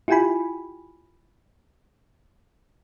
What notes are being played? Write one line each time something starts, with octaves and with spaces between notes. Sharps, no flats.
E4 F4 G4 G5 G#5 B5